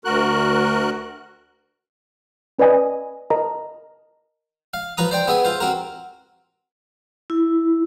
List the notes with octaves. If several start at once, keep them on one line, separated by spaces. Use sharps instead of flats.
D2 F#4 A#4 F#6
C#4 B4 D5 D#5 G#5 D#6
A#4 D#5 A5 A#5
F5
F3 B4 A#5 D#6
C5 D5 G5
B3 G#4 E5 G#5
F4 C5
C4 F#4 A#4
E4